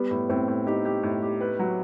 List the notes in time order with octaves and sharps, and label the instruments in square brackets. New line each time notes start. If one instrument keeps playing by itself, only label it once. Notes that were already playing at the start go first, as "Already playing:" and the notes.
Already playing: [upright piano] G3 [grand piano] B3
[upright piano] A2
[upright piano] A2 [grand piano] C4
[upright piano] A2
[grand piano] D#4 [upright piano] G4
[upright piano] G4
A2
G4
B4
F#3